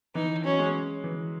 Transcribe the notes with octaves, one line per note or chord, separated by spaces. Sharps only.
E3 D#4
F#3 C#4
G#3
E3